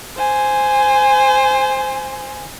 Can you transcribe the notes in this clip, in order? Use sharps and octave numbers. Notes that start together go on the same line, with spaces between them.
C5 G#5